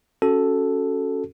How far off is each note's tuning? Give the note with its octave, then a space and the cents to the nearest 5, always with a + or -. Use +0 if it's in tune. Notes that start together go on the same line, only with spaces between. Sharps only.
C#4 +0 F#4 +10 A4 +0